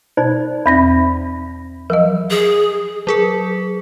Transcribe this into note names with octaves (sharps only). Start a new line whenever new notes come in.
B2 D#4 C5 D5
E2 C4 B5 A#6
F3 F#3 A#4 D#5
G#4
F#3 G#4 A#4